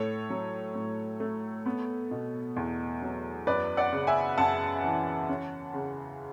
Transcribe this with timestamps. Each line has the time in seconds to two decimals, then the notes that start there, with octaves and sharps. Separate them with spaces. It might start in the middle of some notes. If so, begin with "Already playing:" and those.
Already playing: A2 A4 C#5
0.30 F#3
0.75 A2
1.20 A3
1.66 B3
2.11 B2
2.56 E2
3.02 F#3
3.47 F#2 B4 D5
3.77 D5 F#5
3.92 C#3
4.07 E5 G#5
4.38 F#2 F#5 A5
4.84 E3
5.29 C#4
5.74 C#3